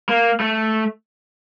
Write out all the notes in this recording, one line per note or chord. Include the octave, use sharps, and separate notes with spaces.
A#3
A3